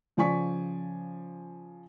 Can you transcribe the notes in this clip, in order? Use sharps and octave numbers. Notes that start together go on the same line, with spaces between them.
C#3 F3 D5 G#5 C#6 B6